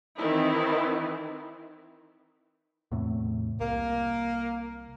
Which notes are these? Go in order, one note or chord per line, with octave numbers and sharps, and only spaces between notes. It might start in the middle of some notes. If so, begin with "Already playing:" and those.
D#3 E3 C4 D#4 E4
E2 A2 C3
C2 A#3